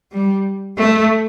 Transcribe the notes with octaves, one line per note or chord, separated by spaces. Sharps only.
G3
A3